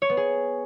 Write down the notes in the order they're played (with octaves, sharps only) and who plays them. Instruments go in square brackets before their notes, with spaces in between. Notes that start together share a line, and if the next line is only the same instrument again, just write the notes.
[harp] C#5
B3
G#4